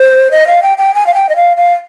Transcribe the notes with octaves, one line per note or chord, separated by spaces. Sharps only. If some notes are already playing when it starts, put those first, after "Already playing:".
Already playing: C5
D#5
F5
G5
G5
G#5
F5
G5
D#5
F5
F5